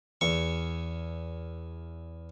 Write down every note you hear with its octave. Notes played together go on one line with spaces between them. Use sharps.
E2 C#6